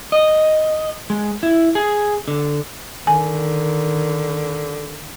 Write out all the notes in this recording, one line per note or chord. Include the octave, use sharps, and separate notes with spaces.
D#5
G#3
E4
G#4
D3
D3 D#3 G#5